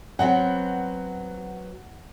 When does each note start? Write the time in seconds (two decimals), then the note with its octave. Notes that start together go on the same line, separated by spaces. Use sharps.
0.19 F#3 B3 C4 F#5